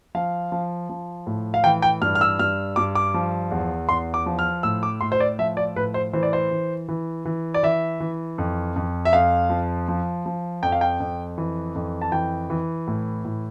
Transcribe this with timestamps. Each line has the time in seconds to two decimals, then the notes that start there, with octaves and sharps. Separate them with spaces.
0.15 F3 F5
0.52 F3
0.89 F3
1.27 A2
1.54 F5
1.64 E3 G5
1.82 G5
2.01 G2 F6
2.15 F6
2.21 E6
2.39 G2 F6
2.76 G2 D6
2.95 D6
3.14 F3
3.51 E2
3.89 E2 C6
4.14 D6
4.26 F3
4.39 F6
4.63 A2 E6
4.83 D6
5.01 A2 C6
5.12 C5
5.20 D5
5.39 F3 E5
5.57 D5
5.76 A2 B4
5.94 C5
6.13 E3 C5
6.23 D5
6.33 C5
6.51 E3
6.89 E3
7.25 E3
7.54 D5
7.63 E3 E5
8.00 E3
8.38 F2
8.76 F2
9.05 E5
9.13 F2 F5
9.50 F3
9.88 F3
10.26 F3
10.63 F2 G5
10.72 F5
10.81 G5
11.00 F2
11.38 E3
11.75 F2
12.02 A5
12.12 E3 G5
12.50 E3
12.87 A2
13.25 A2